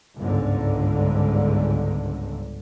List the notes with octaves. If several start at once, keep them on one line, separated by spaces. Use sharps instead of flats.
G1 C#2 G#2 D3